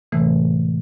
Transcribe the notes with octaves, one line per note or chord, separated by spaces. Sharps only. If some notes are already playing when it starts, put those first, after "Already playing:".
A2 C3 E3 G#3 A3